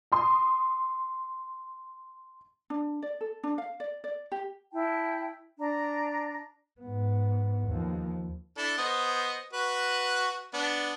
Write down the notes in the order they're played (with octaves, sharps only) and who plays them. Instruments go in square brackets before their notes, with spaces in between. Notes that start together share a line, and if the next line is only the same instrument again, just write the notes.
[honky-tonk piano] A#5 C6 D#6
[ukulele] D4
D5
A4
D4
F5
D5
D5
G4
[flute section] E4 G5 A5
D4 A#5
[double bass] G#2 B3
D#2 F3
[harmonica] D4 E4 A4
B3 C5 D#5
F#4 B4
B3 D4